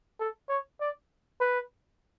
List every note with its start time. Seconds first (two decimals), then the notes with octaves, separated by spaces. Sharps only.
0.19 A4
0.49 C#5
0.81 D5
1.41 B4